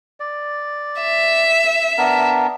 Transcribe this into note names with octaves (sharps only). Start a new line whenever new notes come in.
D5
E5
B3 D4 A#4